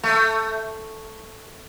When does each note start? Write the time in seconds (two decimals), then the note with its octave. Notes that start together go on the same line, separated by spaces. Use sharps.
0.03 A3